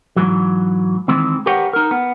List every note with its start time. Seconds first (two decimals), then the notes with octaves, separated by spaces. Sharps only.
0.16 G#2 E3 F#3
1.08 D#3 E3 G#3 C4
1.46 G4 A#4 B4 C#5 F#5 G5
1.73 D#4 A#4
1.91 B3